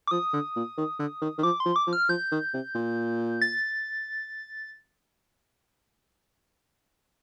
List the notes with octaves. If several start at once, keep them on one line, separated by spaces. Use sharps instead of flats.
D6
F3 D#6
D3
A#2
D#3
D3
D#3
D#3
F3 D6
C6
F3
D6
F3
F6
F3 G6
D#3
C3
A#2
A6